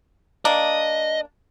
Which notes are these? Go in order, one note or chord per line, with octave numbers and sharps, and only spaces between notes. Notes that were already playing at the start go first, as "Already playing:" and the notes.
A#3 D4 D#5